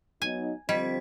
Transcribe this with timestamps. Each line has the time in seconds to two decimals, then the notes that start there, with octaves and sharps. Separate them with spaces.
0.22 F#3 B3 D#4 G#5
0.69 D3 F3 G3 C4 D#5 G#6 B6